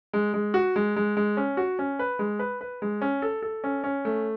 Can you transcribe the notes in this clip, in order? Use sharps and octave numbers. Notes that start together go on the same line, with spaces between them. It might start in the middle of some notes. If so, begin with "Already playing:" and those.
G#3
G#3
F#4
G#3
G#3
G#3
C#4
F#4
C#4
B4
G#3
B4
B4
G#3
C#4
A4
A4
C#4
C#4
A3